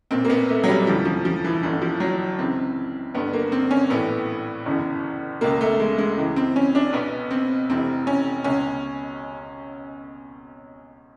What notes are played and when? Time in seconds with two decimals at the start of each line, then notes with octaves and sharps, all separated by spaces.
0.11 B1 A#2 C4
0.25 A#3
0.30 B3
0.49 A3
0.64 F#3
0.68 G3
0.87 E1 D2 C3 E3 F3
1.05 F3
1.25 F3
1.44 E3
1.62 G1 F#2 D3 E3
1.82 F3
2.00 F#3
2.38 C#2 C#3 E3 C4
3.14 G1 G2 D3 B3
3.33 A#3
3.52 C4
3.71 C#4
3.90 A#1 A2 E3 B3
4.66 G1 F#2 C#3 E3
5.41 C#2 B2 A#3
5.61 A3
5.80 G#3
5.98 G#3
6.17 C#2 C#3 E3
6.36 C4
6.56 C#4
6.75 D4
6.93 B1 B2 B3
7.31 C4
7.69 F1 F2 C3 E3 C4
8.07 C#4
8.44 C#2 B2 C#4